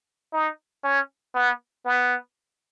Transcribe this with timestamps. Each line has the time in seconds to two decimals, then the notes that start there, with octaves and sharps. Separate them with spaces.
0.33 D#4
0.84 C#4
1.35 B3
1.85 B3